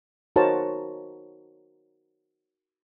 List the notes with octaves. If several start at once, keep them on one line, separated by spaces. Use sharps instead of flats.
D#4 F#4 A#4 C5 C#5 A5